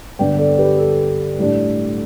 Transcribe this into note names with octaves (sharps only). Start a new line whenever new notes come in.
G2 D3 B3 D4 D5 G5
A4 D5
G4 B4
A4
A2 G3 D4